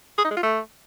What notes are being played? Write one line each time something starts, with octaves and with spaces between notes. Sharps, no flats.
G#4
D#4
G#3
F4
A3